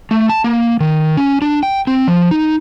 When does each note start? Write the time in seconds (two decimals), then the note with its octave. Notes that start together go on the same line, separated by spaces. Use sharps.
0.11 A3
0.29 A5
0.44 A#3
0.80 D#3
1.17 C#4
1.42 D4
1.63 G5
1.87 C4
2.08 F3
2.31 D#4